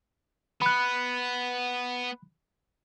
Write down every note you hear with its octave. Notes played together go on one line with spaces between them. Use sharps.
B3 B5 F#6